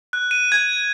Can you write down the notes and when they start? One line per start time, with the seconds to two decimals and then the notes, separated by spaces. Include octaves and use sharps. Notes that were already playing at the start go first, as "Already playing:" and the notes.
0.13 F#6
0.31 D#7
0.52 G#6